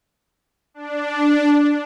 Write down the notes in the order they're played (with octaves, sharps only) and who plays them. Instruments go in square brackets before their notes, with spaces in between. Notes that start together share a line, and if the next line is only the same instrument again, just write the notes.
[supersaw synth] D4